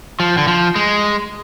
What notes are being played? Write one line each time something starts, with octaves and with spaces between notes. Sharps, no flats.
F3
D3
F3
G#3